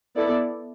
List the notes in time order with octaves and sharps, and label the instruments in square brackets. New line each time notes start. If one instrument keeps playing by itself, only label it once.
[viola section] B3 E4 A4 D5